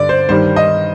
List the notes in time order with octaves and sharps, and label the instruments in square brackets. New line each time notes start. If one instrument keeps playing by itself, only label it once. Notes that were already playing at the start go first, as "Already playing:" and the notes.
Already playing: [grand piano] G2 D3 D5
C5
G2 D#3 G3 C5
D#5